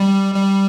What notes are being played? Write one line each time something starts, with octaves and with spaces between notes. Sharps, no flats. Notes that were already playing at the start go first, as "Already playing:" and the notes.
Already playing: G3
G3